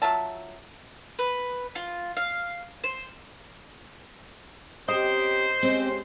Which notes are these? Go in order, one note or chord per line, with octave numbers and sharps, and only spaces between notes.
F#3 F4 E5 A5
B4
F4
F5
C5
C4 C#4 G4 A#4 C5 D#5
G#3 C4 C#4 G4